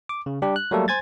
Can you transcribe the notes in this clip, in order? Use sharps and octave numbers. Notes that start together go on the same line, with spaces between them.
D6
C#3
G3 D4 G4
F#6
F#3 G3 A3 A#3 A4
C5 G#5 G#6 A6